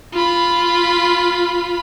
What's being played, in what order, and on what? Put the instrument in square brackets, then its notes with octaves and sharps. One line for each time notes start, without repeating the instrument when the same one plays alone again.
[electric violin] F4 B5